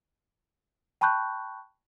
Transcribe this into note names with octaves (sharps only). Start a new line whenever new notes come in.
G5 A5 B5 C#6 F#6 G6